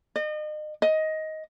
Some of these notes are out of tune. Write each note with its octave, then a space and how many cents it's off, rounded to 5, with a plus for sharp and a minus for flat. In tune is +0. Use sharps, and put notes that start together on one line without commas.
D#5 -35
D#5 +15